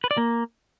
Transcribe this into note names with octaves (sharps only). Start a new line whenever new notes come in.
B4
D5
A#3